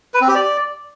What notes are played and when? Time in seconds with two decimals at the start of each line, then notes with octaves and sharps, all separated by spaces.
0.14 B4
0.21 C4
0.28 G4
0.35 D5